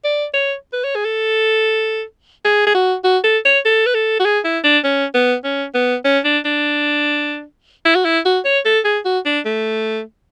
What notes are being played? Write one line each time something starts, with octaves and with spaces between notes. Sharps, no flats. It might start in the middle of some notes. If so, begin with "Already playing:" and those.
D5
C#5
B4
C#5
G#4
A4
G#4
G#4
F#4
F#4
A4
C#5
A4
B4
A4
F#4
G#4
E4
D4
C#4
B3
C#4
B3
C#4
D4
D4
E4
F#4
E4
F#4
C#5
A4
G#4
F#4
D4
A3